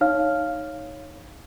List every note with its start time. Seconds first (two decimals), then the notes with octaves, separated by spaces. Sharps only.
0.01 D#4 C#5 F5 F6